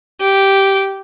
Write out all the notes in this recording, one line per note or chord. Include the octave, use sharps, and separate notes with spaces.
G4